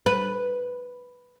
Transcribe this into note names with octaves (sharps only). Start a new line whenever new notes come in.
B4